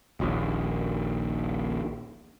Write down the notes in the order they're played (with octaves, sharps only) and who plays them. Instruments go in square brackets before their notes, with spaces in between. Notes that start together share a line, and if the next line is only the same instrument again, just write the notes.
[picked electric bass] D#1 A#1 D#2